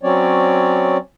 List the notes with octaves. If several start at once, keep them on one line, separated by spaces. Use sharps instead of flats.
F#3 C4 C#4 C#5 D5